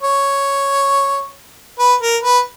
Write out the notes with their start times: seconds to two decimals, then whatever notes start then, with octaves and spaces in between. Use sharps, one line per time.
0.03 C#5
1.79 B4
2.01 A#4
2.23 B4